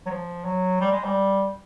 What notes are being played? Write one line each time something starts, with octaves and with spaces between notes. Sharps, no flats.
F#3
F3
F#3
G3
G#3
G3